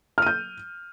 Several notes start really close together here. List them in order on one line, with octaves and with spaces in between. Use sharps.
F6 D#7 G6